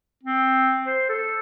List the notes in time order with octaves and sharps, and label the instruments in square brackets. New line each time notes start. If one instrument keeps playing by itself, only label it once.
[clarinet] C4
C5
A4